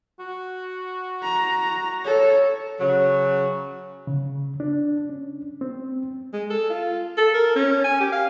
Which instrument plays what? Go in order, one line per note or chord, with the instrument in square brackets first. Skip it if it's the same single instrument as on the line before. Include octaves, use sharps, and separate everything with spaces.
[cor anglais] F#4
[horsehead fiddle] A#5
[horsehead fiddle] A4 [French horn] C#5
[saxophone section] C#3 F#3
[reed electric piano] C#3
D4
C#4
C4
[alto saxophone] G#3
A4
F4
A4
A#4
C#4
G#5
G4
F5